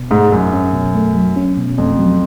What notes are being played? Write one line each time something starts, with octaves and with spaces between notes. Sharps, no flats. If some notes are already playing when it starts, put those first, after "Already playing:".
Already playing: B2
G#2 A3
F#2 F#3
C#4
B2
A3
F#3
C#4
B2
F2 A3
F#3